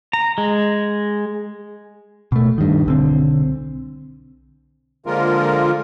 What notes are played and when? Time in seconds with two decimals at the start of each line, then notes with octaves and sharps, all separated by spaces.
0.13 A#5
0.38 G#3
2.32 B2 A3
2.58 G2 D#3
2.86 B1 D3 C4
5.06 D3 F3 G#3 A#3 F4 A#4